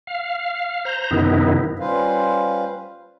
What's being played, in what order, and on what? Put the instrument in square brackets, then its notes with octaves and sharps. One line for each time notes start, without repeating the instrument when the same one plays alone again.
[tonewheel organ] F5
C5 A#5
F#2 C3 D#3 B3 D#4 E4
[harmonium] G3 C#4 F4 B4 C5 F5